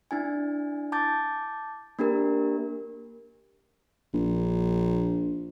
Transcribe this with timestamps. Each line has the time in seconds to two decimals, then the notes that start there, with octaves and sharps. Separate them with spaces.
0.11 D4 E4 G#5
0.92 A5 D6 G6 A6
1.99 A#3 D4 G4 A#4
4.14 A#1